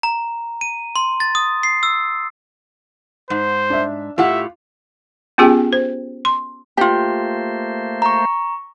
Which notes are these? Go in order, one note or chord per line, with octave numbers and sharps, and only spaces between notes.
A#5
D#7
C6
A6
D#6
C7
E6
G#2 C5
D4 E5
A2 F4 G4 E5 F#5
B3 C#4 F4 G4 G#4 G5
C5
C6
A3 A#3 F4 G4 C5
A#5 C#6